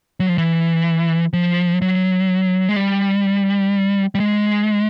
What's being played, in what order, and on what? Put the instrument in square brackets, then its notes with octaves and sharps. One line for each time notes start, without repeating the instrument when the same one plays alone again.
[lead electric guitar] F#3
F3
E3
F3
F#3
G#3
G3
G3
G#3